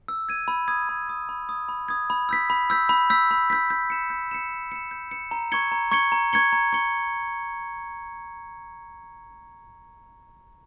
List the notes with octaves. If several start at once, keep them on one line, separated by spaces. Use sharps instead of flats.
E6
G#6 D#7
B5
D#6 G#6
B5
D#6 G#6
B5
D#6 G#6
B5
D#6 G#6
B5
E6 G6 B6
B5
E6 G6 B6
B5
E6 G6 B6
B5
E6 G6 B6
G6
C#7 E7
G6
C#7 E7
G6
C#7 E7
G6
C#7 E7
A#5
C#6 G#6 C#7 G7
A#5
C#6 G#6 C#7 G7
A#5
C#6 G#6 C#7 G7
A#5
C#6 G#6 C#7 G7